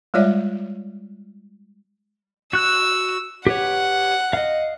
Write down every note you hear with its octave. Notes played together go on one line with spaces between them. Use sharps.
G3 G#3 F4 C#5 D5 E5
F#4 E6 F#6
G4 B4 C#5 F#5
D#5 F5